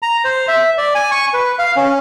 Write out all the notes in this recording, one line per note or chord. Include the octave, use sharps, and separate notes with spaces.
A#5
C5
E5
D5
G#5
C#6
B4
F5
C#4